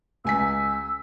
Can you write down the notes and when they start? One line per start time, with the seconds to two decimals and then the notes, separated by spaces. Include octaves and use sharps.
0.25 C#2 G#5 E6 B6